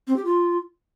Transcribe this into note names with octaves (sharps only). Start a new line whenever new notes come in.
C4
G4
F4